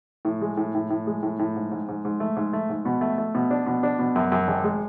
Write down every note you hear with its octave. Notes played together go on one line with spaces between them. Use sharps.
A2
G#3
A2
A2
A2
G#3
A2
A2
G#2
G#2
G#2
G#2
A3
G#2
A3
G#2
B2
A3
A3
B2
D4
B2
D4
B2
F#2
F#2
G#1
G#3